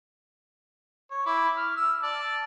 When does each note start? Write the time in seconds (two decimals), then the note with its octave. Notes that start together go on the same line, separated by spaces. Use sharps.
1.11 C#5
1.26 E4 D6
1.57 F6
1.77 E6
2.03 D5 A5